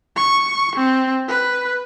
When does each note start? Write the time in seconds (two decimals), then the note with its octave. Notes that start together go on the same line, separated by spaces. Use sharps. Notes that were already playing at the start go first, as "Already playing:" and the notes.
0.16 C#6
0.76 C4
1.28 B4